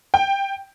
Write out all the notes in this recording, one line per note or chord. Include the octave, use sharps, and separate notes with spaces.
G5